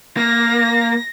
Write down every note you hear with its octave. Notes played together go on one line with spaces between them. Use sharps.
A#3 A#6